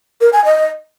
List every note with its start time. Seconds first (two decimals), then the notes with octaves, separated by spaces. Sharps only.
0.21 A#4
0.33 G#5
0.45 D#5